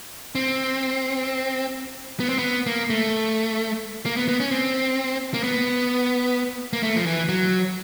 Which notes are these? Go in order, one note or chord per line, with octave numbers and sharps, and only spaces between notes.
C4
B3
C4
B3
A#3
A3
A#3
B3
B3
C#4
C4
A#3
B3
A#3
A3
F3
E3
F#3